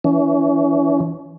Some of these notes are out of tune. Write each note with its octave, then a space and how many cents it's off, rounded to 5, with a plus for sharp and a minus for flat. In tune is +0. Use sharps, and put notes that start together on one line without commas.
E3 +0 C#4 +35